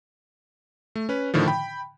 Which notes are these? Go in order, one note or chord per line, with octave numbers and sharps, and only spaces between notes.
A3
C#4 B4
A2 D3 D#3 F3
G5 B5